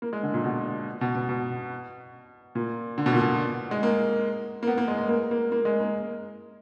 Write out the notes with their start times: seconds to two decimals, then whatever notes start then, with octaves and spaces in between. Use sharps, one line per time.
0.02 A#3
0.13 G#3
0.23 D3
0.34 A#2
0.44 B2
1.01 B2
1.15 B2
1.29 B2
2.55 A#2
2.98 D3
3.06 B2
3.13 A#2
3.22 B2
3.71 G#3
3.83 A#3
4.63 A#3
4.67 B3
4.78 A#3
4.88 G#3
4.98 G#3
5.09 A#3
5.31 A#3
5.52 A#3
5.65 G#3
5.80 A#3